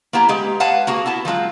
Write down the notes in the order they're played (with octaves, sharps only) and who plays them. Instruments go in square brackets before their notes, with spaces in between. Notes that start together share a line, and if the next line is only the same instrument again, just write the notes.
[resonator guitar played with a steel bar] A#3 B3 E4 G4 A#5
G#3 G4 B4
B4 C#5 F5 F#5 A5
A#3 F#4 G#4
B3 E4 A5
F3 F#3 G#3 F4